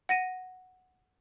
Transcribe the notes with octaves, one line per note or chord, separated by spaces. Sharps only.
F#5 A#6 D#7